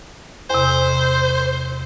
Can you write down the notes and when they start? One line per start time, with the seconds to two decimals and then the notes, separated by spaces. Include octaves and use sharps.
0.50 E2 C3 C5